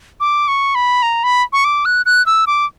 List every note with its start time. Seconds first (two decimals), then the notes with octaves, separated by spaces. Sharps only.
0.20 D6
0.48 C#6
0.75 B5
1.02 A#5
1.24 B5
1.53 C#6
1.64 D6
1.85 F#6
2.06 F#6
2.26 E6
2.47 D6